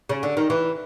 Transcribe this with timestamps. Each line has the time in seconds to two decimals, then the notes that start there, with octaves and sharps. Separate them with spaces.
0.09 C#3
0.23 D3
0.37 D#3
0.50 E3